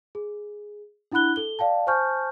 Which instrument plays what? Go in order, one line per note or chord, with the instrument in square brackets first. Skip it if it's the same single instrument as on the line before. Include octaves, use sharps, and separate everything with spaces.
[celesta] G#4
D4 E4 F#5 B5 F#6 G7
A4 G7
D5 F5 G5 A5
C5 G#5 A5 C#6 F6 G6